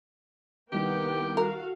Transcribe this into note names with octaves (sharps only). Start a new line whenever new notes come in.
C2 D#3 A#3 B3 G4 G5
F#4 A4 A#4 F5